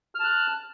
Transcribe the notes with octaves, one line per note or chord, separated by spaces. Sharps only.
A5 F6 F#6